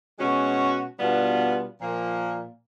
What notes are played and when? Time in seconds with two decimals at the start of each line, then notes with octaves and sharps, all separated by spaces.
0.19 B2 G#3 C#4 F#4
1.00 B2 G3 B3 D4 F4
1.79 A#2 F3 A#3